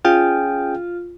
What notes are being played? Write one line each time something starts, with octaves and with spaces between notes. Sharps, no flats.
C#4 F4 G#4 G5